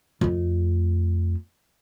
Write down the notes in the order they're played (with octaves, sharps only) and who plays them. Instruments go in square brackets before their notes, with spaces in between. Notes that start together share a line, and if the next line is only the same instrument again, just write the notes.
[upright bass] F2 A3